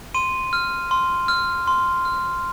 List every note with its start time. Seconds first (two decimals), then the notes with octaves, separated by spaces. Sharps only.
0.14 C6 D#7
0.53 F6
0.91 C6
1.28 F6
1.67 C6
2.05 F6